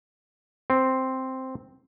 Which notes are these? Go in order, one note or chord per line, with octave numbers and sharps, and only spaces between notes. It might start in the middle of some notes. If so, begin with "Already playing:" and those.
C4